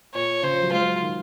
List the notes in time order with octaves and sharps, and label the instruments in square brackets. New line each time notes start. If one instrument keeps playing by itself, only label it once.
[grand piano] A#2 [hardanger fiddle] C#5
[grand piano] C#3 [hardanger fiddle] C5
[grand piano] F3
F#3
[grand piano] G#3 [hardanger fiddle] F4
[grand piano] F#3
D#3